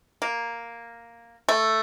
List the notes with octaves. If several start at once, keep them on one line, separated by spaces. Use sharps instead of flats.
A#3
A3